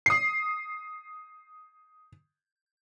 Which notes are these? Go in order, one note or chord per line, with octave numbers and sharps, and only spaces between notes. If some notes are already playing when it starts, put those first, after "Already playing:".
D#6 C7